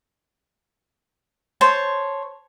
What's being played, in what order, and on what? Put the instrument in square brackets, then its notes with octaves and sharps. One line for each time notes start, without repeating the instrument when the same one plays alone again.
[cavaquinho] C5 C#5 A5